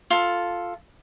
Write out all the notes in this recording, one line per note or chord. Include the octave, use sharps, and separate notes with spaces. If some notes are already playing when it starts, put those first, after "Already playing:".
F4 A4